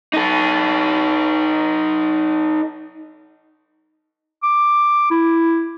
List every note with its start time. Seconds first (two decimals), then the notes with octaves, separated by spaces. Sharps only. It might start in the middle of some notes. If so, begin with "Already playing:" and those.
0.13 D#4 A4
4.43 D6
5.11 E4